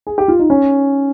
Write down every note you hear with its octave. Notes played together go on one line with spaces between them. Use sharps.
G#4
G4
F4
D#4
C#4